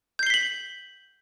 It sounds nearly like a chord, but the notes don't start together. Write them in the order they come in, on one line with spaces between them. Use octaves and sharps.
G6 C7 G7 B6 F#7